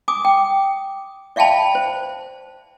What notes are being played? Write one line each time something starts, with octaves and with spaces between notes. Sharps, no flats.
G#5 D6 D#6
G5
D5 E5 F5 G5 A5 B5
C5